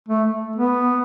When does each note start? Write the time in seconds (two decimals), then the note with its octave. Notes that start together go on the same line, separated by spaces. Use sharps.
0.09 A3
0.56 B3